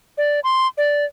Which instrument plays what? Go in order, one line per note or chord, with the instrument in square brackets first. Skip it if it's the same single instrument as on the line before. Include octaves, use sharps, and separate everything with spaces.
[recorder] D5
C6
D5